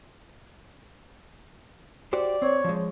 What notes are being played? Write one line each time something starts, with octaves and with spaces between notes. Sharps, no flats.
F#4 G4 C5 D5
C4 C#5
F3 G#3